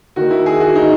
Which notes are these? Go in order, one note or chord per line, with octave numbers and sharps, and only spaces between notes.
D#3 A#3 F#4
E4
G#4
F#4
D#4